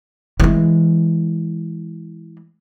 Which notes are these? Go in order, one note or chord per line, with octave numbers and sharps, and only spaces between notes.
E3 G#3